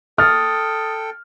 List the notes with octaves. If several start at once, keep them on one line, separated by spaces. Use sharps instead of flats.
A4 G5 D#6 F6 A6